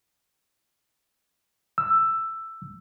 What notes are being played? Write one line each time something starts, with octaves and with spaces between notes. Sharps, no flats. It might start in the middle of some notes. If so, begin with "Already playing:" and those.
E6